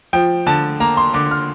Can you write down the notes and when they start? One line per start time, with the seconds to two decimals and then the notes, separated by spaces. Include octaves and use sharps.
0.13 F3 G5
0.46 D3 A5
0.80 A#3 A#5
0.97 C6
1.14 D3 D6
1.31 F6